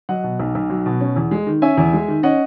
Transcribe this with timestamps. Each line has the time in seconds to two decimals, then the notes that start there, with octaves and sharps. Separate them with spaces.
0.09 F#3 D#5 F#5
0.24 B2
0.40 B1
0.55 B1
0.70 F#3
0.86 B2
1.00 C#4
1.16 E2
1.31 G#3
1.47 D#3
1.62 C#4 E5 G#5
1.77 E2
1.93 G#3
2.08 D#3
2.23 C#4 D#5 F#5